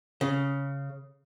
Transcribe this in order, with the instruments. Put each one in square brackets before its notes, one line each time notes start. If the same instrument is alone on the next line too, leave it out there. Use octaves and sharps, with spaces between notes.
[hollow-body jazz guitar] C#3